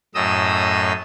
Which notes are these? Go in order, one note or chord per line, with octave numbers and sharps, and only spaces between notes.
F#2 A2 D#5 D#6 E6